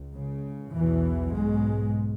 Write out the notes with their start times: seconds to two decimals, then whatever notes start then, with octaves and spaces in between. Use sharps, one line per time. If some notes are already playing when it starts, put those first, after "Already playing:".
Already playing: C#2
0.15 C#3
0.75 B1 E2 B2 E3
1.35 G#2 G#3